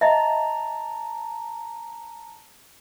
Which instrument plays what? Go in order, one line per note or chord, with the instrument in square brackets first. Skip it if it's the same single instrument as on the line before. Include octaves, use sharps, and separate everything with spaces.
[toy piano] D#5 E5 [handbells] A5 A#5